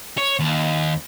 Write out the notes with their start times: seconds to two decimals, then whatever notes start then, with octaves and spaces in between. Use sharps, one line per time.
0.18 C#5
0.39 D#2